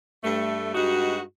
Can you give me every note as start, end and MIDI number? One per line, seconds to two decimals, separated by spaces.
0.24 0.74 43
0.24 0.74 57
0.75 1.21 43
0.75 1.21 56
0.75 1.21 63
0.75 1.21 66